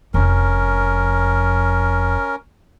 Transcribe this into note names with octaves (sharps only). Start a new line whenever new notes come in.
F1 F2 C#4 A#4